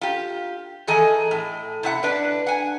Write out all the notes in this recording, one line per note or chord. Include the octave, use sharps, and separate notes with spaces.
F4 G4
D#3 E3 G#4 A4 D#5 G#5
A2
C3 E4 F#5
D4 B4 D5
F#5 G#5